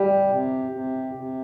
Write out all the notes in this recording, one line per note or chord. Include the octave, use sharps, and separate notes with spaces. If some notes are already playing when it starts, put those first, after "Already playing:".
Already playing: G3 G4
C3
C3
C3